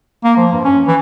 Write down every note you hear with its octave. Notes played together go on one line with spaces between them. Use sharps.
A#3
F3
G2
C#4
E3